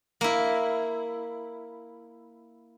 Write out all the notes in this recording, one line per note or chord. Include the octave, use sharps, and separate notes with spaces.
A#3 E4